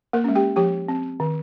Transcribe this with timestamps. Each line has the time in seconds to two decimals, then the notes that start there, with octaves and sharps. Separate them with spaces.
0.13 A#3 A#4
0.24 G#3 C#4
0.35 G4 G5
0.56 F3 G4 G5
0.88 C4
1.20 D#3